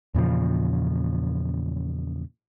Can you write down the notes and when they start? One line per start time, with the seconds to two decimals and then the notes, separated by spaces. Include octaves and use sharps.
0.15 E2 A#2 C#3 F3